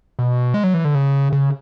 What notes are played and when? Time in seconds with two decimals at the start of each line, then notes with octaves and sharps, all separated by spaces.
0.19 B2
0.54 G#3
0.64 F#3
0.74 E3
0.85 D3
0.95 C#3
1.33 C#3